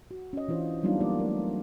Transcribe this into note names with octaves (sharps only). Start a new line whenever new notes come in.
F#4
C#4 D#5
E3 D4 F4 C5
F#3 G3 B3 D4 D#4 F4
A#3 F4 D5
A3 A#4